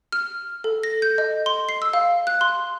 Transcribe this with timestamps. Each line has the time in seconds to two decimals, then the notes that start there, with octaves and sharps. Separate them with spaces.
0.12 F6
0.64 A4
0.83 A#6
1.02 G6
1.18 D#5
1.46 C6
1.69 C7
1.82 E6
1.93 F5
2.27 F#6
2.41 C6